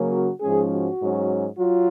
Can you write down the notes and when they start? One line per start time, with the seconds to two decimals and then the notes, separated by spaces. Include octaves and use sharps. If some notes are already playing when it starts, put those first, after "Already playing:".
Already playing: C#3 F#3 A#3 C#4
0.12 F#4
0.41 G#2 F3 G#3 C#4 G#4
0.72 F#4
1.00 G#2 F#3 C#4
1.59 F#3 F4